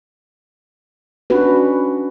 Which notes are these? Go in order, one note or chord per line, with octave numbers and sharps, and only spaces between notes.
C#4 D4 F#4 B4